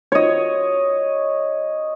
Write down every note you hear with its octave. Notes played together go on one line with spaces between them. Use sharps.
C#5 D#5